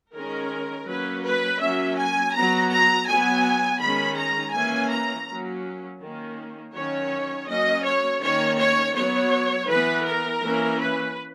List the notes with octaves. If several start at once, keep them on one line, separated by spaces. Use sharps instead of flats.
D#3 G#3 C#4 A#4
F#3 A#3 C#4 B4
B4
F#3 A#3 C#4 E5
G#5
F#3 B3 A#5
A#5
F#3 B3 G#5
D#3 G#3 C#4 B5
A#5
E3 A#3 C#4 G#5
A#5
F#3 A#3 C#4
D#3 A#3 C#4
D#3 F#3 C#4 C#5
F#3 A#3 C#4 D#5
C#5
D#3 A#3 C#4 C#5
C#5
F#3 B3 C#5
E3 B3 B4
A#4
E3 A#3 C#4
B4